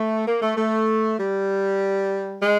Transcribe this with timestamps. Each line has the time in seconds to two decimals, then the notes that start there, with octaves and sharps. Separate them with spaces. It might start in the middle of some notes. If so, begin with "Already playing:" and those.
Already playing: A3
0.26 A#3
0.41 A3
0.56 A3
1.18 G3
2.42 G#3